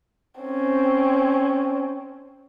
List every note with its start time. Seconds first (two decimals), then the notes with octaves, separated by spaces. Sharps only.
0.41 C4 C#4